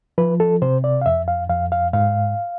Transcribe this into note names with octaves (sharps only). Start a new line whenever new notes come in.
F3 B4
A4
C3 C5
D5
F5
F2 E5
F5
F2 F5
F5
G#2 F5